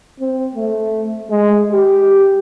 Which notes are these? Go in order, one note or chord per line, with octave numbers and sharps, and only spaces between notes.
C4
A3
G#3
G4